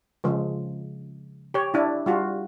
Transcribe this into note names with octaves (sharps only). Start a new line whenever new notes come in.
C#3 F3 G#3
G4 C#5
D4 E4
G3 F4 F#4